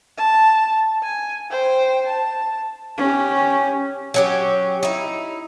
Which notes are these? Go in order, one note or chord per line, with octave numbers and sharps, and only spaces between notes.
A5
G#5
C5 G5
A5
C#4 G4
F#3 C#4 G4
D#4 E4